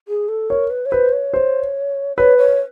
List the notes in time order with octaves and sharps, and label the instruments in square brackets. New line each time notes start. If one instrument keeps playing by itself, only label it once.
[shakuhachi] G#4
A4
[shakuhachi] A#4 [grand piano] C#5
[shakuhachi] B4
C#5
[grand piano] B4 [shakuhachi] C5
[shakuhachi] C#5
[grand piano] C5
[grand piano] B4 [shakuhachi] C#5
[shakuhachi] C#5